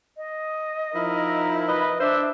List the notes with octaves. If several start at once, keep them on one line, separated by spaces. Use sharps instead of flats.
D#5
F3 D#4 E4 A#4
B4 D#5
D4 C5 E5